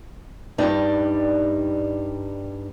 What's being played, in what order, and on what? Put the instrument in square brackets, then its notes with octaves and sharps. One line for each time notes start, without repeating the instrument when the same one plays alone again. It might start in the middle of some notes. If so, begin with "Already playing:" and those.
[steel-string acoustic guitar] G2 G3 D#4 D5 G5